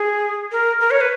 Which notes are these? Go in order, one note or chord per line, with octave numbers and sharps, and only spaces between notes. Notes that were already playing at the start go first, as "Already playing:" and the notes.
Already playing: G#4
A#4
A#4
C#5
B4